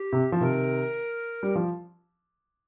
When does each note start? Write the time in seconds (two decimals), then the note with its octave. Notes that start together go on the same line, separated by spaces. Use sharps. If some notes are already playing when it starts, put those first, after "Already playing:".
Already playing: G4
0.12 C3
0.32 F3
0.40 C3 D#3 A#4
1.43 G3
1.55 F3